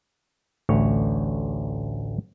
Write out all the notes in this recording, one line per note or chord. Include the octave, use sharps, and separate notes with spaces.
A1 D2 C#5